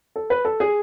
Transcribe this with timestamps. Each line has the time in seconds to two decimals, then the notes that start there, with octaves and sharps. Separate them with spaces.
0.16 A4
0.30 B4
0.45 A4
0.60 G#4